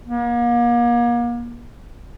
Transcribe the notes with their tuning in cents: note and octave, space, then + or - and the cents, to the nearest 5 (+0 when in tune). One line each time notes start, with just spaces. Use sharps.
A#3 +35